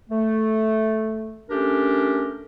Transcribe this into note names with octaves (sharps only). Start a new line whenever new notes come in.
A3
A3 C#4 D4 G4 A#4